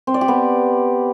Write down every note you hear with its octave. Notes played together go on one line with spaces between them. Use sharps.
C4
D5
G4
B3